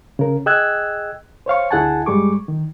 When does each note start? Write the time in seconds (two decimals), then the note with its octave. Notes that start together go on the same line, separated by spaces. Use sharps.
0.19 C#3 A#4
0.46 G#4 D#5 G5 E6 F#6 G#6
1.46 C5 C#5 F5 C#6
1.71 D2 E4 G#4 F#5 G#5 A5
2.06 G2 G3 G#3 G#4 C#6 D6
2.48 D#3